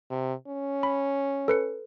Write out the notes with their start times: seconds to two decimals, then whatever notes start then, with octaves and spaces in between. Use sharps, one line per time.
0.10 C3
0.48 C#4
0.83 B5
1.48 A4 B4 C#7